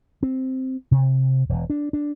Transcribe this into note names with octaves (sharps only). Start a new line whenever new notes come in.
C4
C3
E1
D4
D4